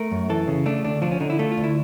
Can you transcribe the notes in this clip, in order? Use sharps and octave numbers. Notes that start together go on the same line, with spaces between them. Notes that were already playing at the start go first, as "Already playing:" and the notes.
Already playing: A3 A#4
F#2
E3 A4
C#3
A3 D4
D2 D4
F3 D4
C#4
D3 D#4
E4
A3 F4
F4
D2
E4